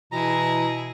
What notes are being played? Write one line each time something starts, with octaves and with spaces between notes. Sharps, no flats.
B2 E3 E4 G#4 A#5